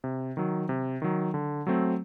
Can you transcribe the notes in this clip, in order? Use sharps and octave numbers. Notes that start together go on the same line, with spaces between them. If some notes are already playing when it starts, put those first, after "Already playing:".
C3
D#3 F#3
C3
D#3 F#3
D3
F#3 A3 C4